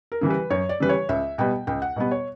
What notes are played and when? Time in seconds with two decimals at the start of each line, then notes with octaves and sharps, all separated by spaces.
0.12 A#4
0.21 C#3 E3 G3
0.30 B4
0.50 F#2 C#5
0.69 D5
0.80 C#3 E3 G3 B4
0.89 C#5
1.09 C#2 E5
1.38 B2 G3 B3 G5
1.67 C#2 G5
1.82 F#5
1.96 B2 G3 B3
2.11 C#5